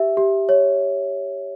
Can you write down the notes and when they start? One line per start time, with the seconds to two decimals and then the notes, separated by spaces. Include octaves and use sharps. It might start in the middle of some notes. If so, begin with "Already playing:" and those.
Already playing: G4 E5
0.17 G4
0.49 C#5